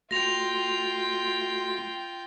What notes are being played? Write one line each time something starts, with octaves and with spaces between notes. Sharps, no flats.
A3 F4 F#4 G5 C6 A#6 F7